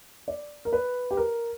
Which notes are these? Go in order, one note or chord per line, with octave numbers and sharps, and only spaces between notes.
D5
A#4
B4
G4
A#4